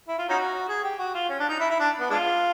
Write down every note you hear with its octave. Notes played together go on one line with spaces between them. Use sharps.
E4
F4
C#4 D#4 F#4
G#4
G4
F#4
F4
C#4
D4
D#4
E4
E4
D4
B3
G#3 D4 F4